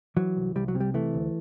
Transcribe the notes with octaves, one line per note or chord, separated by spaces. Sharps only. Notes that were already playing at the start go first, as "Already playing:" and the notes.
E3 F#3
C2
C2 G3
F#3
C3
G3
E3 A3
D2